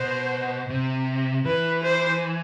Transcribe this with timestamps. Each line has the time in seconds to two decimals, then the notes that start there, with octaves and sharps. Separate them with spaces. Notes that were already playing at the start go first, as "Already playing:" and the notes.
Already playing: B2 C5
0.70 C3
1.45 E3 B4
1.83 C5